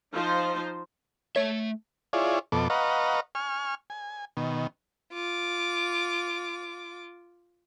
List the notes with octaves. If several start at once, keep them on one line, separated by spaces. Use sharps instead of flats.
F3 D#4 F4 C5
A3 C#5 E5
E4 F4 G#4 C#5 D5
F2 B2 A4 D6
B4 D#5 F5 F#5 A#5 C#6
G#5 C#6 F6
G#5
B2 D#3
F4 D6